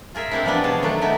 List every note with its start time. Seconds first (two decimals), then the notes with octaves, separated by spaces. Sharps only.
0.15 F4 G#4 A#4 E5
0.31 G#3 A#3 C4 D4 E4
0.45 E3 F3 G3 G#3 B3 D4
0.63 B2 F4 G#4 C#5 A5
0.82 D#3 F#3 A3 B3 D4
1.02 A3 B3 D#4 E4